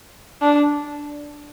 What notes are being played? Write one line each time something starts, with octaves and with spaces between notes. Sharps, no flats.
D4